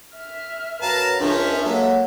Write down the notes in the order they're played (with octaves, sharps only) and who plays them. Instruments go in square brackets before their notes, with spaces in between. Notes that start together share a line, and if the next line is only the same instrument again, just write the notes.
[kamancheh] E5 F6
[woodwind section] F#2 A#5 [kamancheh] B4 [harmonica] F5 A5
[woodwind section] C#2 D4 [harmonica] F3 C#4 [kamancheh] A#4 E5
[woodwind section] F#3 A#3 [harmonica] G#3 A4